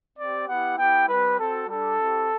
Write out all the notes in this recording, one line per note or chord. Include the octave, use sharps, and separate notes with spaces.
C4 G4 D5
B3 E4 G4 F#5
B3 E4 G4 G5
G3 C4 G4 B4
C4 F#4 A4
G3 D4 G4 A4
C4 E4 G4